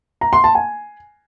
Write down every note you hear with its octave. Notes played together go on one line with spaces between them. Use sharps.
A#5
C6
A5
G#5